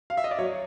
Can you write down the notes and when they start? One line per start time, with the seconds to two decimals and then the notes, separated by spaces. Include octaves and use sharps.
0.10 F5
0.17 E5
0.24 D#5
0.31 D5
0.39 F#3 C#5